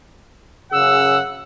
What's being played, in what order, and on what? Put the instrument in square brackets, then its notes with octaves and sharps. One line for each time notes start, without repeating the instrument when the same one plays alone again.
[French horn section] F#2 C#3 G#4 [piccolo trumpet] F#5 [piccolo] E6